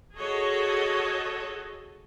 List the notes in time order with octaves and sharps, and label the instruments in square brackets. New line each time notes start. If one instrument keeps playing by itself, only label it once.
[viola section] F#4 G#4 A4 C#5 D#5